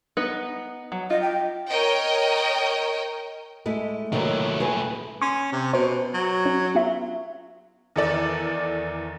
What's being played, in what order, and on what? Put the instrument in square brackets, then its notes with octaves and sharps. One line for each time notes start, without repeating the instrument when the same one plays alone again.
[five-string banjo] B3 D#4 B4
F#3
[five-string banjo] F4 [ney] D#5
[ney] G5
[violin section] A#4 C#5 D#5 G5
[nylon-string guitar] G#3 A3 E4
[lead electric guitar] A#2 A3 [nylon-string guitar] D#3 F#3 B4
[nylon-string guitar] G#4 B4
[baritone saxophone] C#4 [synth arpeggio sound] C6
[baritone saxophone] C3
[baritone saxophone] B2 [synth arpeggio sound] C5
[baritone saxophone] F#3
[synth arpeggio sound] C#4
B3 F4 E5
[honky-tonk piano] E2 D#3 A4 D5